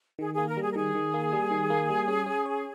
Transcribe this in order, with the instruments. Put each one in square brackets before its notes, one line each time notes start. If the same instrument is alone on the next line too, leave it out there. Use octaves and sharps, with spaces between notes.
[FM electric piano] D#3 [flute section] G#4
[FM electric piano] A#3 [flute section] G#4
[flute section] A#4
[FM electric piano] G3 [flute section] G#4
[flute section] A#4
[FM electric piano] D#3 [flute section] G#4
[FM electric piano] D#3
A#3
G3
D#3
A#3
G3
C#4
C#4
C#5